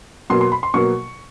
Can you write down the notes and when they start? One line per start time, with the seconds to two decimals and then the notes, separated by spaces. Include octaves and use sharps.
0.30 B2 F#3 A#3 C6
0.41 C6
0.52 B5
0.63 C6
0.74 B2 F#3 A#3 C#6